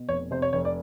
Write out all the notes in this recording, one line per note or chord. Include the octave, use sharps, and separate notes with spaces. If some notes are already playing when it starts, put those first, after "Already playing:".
Already playing: B2
F1 C#5
C3 C5
C#5
F1 C#5
D5